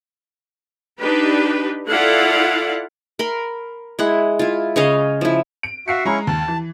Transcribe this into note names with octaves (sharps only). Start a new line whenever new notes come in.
D4 D#4 G4 B4
E4 F4 A4 D5 F5 F#5
A#4 B5 C6
G#3 E4 F#5
E4 F4
C#3 C#5 D#5 F5
F3 E4
D7
F#4 E5 F5 C7 C#7
G#3 C#4 E4 A#5 C#6
D#2 A5
E3